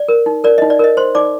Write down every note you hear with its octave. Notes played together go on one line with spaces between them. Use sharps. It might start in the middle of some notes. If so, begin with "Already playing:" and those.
Already playing: D5
A#4
D#4
A#4 D5
D#4 D#5
D5
A#4 D#5
C5 C6
D#4 D5 D6